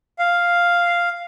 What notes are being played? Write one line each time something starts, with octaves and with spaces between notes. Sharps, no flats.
F5